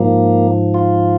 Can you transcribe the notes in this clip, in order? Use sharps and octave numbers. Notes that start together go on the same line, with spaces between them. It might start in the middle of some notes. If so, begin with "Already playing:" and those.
Already playing: G#2 F3 A#3
F4